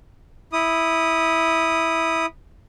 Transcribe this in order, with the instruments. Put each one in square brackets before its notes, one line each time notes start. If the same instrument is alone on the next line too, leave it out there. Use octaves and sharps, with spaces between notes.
[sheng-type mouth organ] E4 D#6